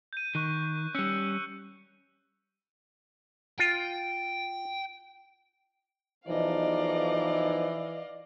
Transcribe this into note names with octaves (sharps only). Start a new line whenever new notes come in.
G6 D#7
D#3 C#6 F#6 D#7
G3 C#4 E6 F#6 C#7
F4 G5
B1 E3 F3 D#4 D5 D#5 F5